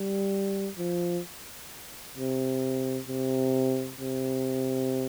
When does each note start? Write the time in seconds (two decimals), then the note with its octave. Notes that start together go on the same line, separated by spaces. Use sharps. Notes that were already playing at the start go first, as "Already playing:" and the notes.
Already playing: G3
0.78 F3
2.17 C3
3.09 C3
4.01 C3